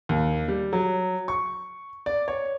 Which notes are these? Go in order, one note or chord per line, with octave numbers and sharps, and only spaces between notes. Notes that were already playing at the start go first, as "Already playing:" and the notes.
D#2
G3
F#3
C#6
D5
C#5